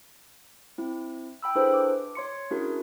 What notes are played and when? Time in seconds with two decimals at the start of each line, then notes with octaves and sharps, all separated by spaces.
0.78 C4 E4
1.42 G5 B5 E6
1.55 D4 E4 G#4 A4 B4 C5
1.74 D6
2.15 C#5 C6 C#7
2.51 C#4 D4 E4 F#4 G#4 A#4